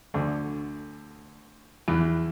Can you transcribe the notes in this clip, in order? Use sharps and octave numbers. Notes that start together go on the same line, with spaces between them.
D2 D3
E2 E3